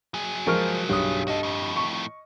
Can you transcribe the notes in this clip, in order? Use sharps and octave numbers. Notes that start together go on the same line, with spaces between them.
F#3 G#4
F3 G#3 A#4 C#6 F6 D7
B1 G2 D#6
F#4 A4 D#5
F2 A2
C#6